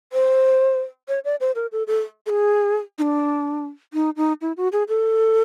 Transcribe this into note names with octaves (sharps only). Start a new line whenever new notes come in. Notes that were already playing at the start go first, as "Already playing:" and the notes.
C5
C#5
D5
C5
A#4
A4
A4
A4
G#4
D#4
D4
D#4
D#4
E4
F#4
G#4
A4